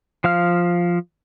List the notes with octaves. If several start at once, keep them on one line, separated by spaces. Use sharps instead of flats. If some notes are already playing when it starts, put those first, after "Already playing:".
F3 F5 F6